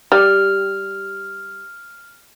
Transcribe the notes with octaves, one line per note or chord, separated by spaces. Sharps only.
G3 F6